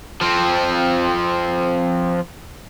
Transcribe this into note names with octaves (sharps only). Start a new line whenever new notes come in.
F3 C4